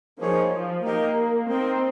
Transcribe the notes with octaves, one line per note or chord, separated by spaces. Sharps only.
F3 A#3 D#4 G#4 C#5
F3
A#3 D#4 G4 A#4 D#5
C4 D#4 A#4 D#5